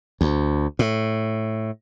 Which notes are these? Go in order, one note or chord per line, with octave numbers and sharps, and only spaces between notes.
D2
A2